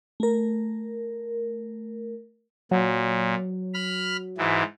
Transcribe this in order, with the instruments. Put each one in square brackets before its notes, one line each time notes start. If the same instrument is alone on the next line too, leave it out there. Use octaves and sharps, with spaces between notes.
[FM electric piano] A3 A#4
[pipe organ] A#2 [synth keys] F#3
[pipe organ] B5 F6
G#2 E3